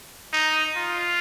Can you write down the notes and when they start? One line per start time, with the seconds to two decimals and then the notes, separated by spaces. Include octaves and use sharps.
0.33 D#4
0.76 F4